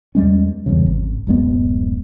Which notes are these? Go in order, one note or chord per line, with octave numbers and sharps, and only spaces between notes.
E2 G3 G#3 C#4
E2 G2 C#3
G#1
D1 F#2 G#3 B3